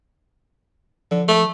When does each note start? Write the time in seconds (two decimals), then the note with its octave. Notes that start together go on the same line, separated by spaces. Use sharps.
1.11 D3 F3
1.28 A3